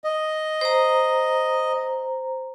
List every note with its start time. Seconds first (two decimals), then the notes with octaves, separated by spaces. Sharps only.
0.04 D#5
0.61 C5 A#5